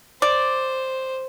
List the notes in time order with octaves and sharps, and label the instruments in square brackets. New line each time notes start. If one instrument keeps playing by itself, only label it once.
[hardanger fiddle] C5 [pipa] D5